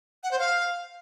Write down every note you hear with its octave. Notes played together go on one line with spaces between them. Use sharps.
F#5
C5
F5